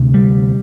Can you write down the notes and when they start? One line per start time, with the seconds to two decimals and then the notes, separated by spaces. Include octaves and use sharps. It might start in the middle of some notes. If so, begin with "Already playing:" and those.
Already playing: D2 C3
0.14 G3